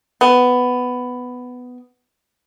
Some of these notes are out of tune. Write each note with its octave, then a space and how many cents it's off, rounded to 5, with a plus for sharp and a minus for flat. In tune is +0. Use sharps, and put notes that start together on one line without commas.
B3 +10